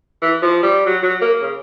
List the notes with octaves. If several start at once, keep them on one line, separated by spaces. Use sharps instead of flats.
E3
F3
G3
F#3
F#3
A#3
C#3